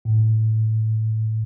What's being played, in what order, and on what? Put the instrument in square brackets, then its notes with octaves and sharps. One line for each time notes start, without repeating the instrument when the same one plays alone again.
[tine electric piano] A2